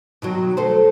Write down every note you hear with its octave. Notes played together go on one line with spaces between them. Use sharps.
B2 D#3 F#3
A3 C5